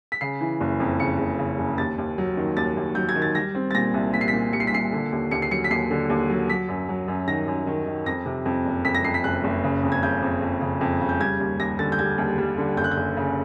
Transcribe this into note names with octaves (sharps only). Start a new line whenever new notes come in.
B6
C#3 C7
E3
F#1
F2
C#3 C#7
F#1
C#3
F#1
D#2 A6
D#2
F#3
D#3
D#2 A6
D#2
F#3 G6
G#6
D#3
A6
G3 A#6
C4
A6
A#2 A#6
C2
A#2 B6
C7
B6
A#2
G3 C#7
C7
B6
A#2 C7
D3
D#2
D#2 C#7
C7
F#3 C#7
B6
D#2 C7
D3
D#2
F#3
F#3 B6
F#2
F#3
F#2
D#3 A#6
F#2
D#3
D#3
F2 A#6
C3
F2
F#1
F2 B6
A#6
F2 C7
B6
F#1 F#6
F#1
C#3
F2
G#6
C#3 G6
F2
F2
C#3
F2
C#3
G6
G3 G#6
D#2
D#2 A#6
D3 A6
G6
G3 G#6
D#2
G3
D3
F#1 G6
F#6
G6
F#1
C#3